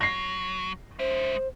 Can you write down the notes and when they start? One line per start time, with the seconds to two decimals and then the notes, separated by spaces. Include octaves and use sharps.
0.01 F#3 A#6 C7
0.99 G#3 C5 E5